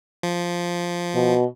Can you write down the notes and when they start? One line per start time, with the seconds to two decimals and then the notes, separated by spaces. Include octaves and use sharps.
0.23 F3
1.14 B2